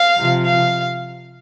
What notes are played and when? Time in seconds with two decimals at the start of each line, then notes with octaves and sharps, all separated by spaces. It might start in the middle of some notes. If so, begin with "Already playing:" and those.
Already playing: F5
0.17 C3 F3
0.44 F5